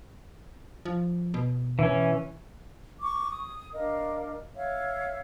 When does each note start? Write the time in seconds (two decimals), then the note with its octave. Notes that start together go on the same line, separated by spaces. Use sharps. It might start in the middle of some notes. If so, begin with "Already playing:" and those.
0.85 F3
1.34 B2
1.79 E3 C#4
3.00 C#6 D6
3.29 D#6
3.73 D4 A#4 D#5 F5
4.55 C#5 E5 F5